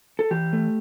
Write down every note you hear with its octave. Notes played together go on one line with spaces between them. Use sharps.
A4
E3 G4
A3